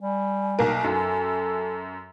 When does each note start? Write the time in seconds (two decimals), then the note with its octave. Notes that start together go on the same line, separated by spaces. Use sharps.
0.01 G3 G#5
0.59 B1 A#3 A#4
0.84 F#2 A4